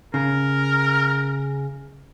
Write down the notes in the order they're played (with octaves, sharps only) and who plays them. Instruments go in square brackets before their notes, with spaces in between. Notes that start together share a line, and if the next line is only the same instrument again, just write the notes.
[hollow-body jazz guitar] C#3 [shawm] A#4